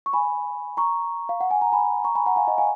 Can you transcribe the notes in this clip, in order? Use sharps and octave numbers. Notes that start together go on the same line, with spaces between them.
C#6
G#5 B5
A#5 C#6
F5
F#5
G#5
A#5
G#5 B5
A#5 C#6
G#5 B5
F#5 A#5
F5 G#5
D#5 F#5
F5 G#5